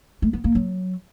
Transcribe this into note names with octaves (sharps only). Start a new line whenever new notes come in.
A3
B3
A#3
F#3